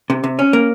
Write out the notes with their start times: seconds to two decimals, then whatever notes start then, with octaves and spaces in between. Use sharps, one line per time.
0.10 C3
0.24 C3
0.39 C#4
0.53 A#3